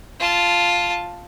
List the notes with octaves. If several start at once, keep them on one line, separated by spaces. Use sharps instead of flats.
F4 A5